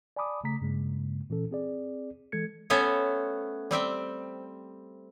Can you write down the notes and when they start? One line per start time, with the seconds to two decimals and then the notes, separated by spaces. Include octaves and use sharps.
0.16 D5 G#5 A5 B5 D6 D#6
0.44 C#3 A3 A#5 B6
0.62 G2 C#3 G#3 A#3
1.30 A#2 E3 C#4 A4
1.51 C4 G#4 D5
2.32 E3 G#3 A4 G#6 C#7
2.70 A3 B3 C#4 C5 C#5
3.71 G3 C4 E5 G5